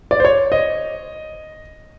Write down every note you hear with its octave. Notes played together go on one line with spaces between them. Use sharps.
D5
C5
C#5
D#5